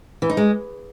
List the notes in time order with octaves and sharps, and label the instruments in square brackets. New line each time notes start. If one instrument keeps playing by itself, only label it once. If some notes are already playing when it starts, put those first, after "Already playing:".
[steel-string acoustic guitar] E3
D#4
G#3